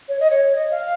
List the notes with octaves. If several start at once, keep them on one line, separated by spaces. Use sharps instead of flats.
C#5
D#5
C#5
D#5
F5